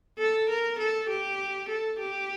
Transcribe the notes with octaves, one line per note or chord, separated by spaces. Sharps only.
A4
A#4
A4
G4
A4
G4